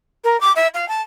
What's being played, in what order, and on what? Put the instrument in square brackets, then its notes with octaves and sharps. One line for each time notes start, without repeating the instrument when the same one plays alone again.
[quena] A#4
D6
E5
F5
A5